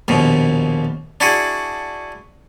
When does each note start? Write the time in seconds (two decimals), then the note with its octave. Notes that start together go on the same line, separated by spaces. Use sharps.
0.08 A#1 D#2 B2
1.20 D4 E4 F#4 G#4